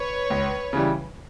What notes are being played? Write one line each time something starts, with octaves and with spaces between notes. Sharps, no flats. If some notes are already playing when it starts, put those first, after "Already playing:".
Already playing: B4 C#5
C#2
C#3 E3 G3